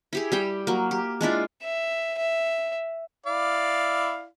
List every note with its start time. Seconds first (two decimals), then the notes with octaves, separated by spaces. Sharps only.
0.13 E4 G4 G#4
0.32 G3 G4 G5
0.67 F#3 A#3
0.91 G4
1.21 G#3 D4 E4 F4
1.62 E5
2.18 E5
3.27 E4 D5 F5